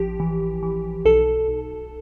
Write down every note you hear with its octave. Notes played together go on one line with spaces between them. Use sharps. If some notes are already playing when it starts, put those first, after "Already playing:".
Already playing: A1 F3 G4
E3
E3
B1 A4
B1